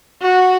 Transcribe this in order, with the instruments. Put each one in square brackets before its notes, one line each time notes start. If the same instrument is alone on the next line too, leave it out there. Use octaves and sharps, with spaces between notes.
[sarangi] F#4